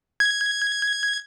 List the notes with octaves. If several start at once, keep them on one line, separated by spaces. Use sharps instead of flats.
G#6